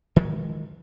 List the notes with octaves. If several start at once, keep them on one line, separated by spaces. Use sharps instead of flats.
D#3 F3 F#3 G#3